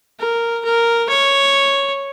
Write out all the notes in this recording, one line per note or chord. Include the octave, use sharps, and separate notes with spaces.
A#4
A#4
C#5